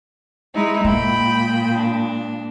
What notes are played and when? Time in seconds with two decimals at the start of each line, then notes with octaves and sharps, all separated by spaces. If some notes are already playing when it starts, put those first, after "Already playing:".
0.54 G#3 D#4 E4
0.85 A#2 G#3 G5 B5
1.77 D4